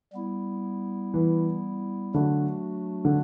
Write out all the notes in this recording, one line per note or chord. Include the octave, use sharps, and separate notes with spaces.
G3 B3 E4
E3
D3 F#3 A3 D4 F#4
D3